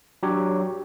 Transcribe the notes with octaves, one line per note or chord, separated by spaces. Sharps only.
F#3 D4 G4 C#5